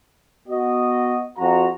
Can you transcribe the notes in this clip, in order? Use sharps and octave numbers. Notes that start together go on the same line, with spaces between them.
B3 F#4 D#5
F2 F#4 A#5